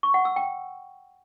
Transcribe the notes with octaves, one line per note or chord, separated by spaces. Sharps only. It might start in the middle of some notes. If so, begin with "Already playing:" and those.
C#6
F#5
E6
G5